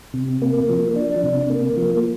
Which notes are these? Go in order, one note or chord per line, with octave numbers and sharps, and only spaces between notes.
C3
A#3
F3
D4
C3
A#3
F3